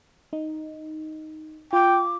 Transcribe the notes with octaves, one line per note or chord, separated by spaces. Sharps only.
D#4
F4 G5 D6